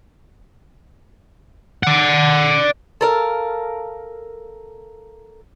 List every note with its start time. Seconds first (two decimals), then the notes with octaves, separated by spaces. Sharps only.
1.83 D5 F#5
3.01 A4 A#4 F5